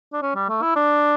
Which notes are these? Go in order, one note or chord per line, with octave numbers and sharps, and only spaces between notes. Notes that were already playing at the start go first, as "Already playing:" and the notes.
D4
C#4
G3
A3
E4
D4